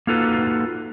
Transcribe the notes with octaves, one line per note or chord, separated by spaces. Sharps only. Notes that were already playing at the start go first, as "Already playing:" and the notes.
A#3 D#4 F4 F#4 A4 B4